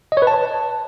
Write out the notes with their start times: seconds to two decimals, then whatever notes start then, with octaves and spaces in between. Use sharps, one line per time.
0.12 D#5
0.17 C#5
0.22 B4
0.27 A5